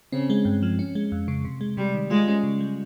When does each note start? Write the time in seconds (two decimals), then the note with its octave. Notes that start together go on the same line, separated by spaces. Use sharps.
0.12 C#3 C4
0.30 G#3
0.45 G2
0.63 F3
0.79 C#4
0.95 G#3
1.12 F2
1.28 C#3
1.45 C3
1.61 G#3
1.77 C3 G3
1.95 D#3
2.11 G#3 F4
2.28 C#4
2.43 C#3
2.60 G3